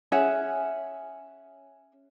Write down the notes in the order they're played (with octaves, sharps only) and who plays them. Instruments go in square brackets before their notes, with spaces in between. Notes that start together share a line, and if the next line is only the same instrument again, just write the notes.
[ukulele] C#4 G#4 E5 F#5